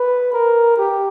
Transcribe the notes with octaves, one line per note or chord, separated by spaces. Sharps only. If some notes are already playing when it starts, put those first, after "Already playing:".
Already playing: B4
A#4
G4